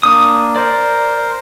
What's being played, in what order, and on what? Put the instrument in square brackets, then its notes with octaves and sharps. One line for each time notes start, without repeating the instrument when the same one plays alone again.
[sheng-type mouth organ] A#3 D4 [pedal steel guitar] D#6
[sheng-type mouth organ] A#4 C5 [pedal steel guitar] D5